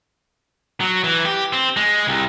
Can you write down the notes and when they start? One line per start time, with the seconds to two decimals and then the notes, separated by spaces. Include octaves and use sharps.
0.81 F#3
1.04 E3
1.25 G4
1.53 C4
1.76 G#3
2.07 C2